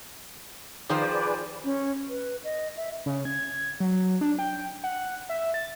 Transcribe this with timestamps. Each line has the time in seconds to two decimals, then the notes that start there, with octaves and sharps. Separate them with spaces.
0.90 D#3 F3 G#4 B4 C5 D5
1.64 C#4
2.09 B4
2.44 D#5
2.77 E5
3.06 C#3
3.25 G#6
3.80 F#3
4.21 D4
4.39 G5
4.84 F#5
5.29 E5
5.54 A6